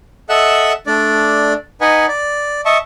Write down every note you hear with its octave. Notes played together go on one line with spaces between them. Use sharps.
A4 D#5 E5 F#5 E6 F#6
A3 D4 D5
D#4 B4 D#5 F#5 G#5
D5
D#5 E5 A5 C#6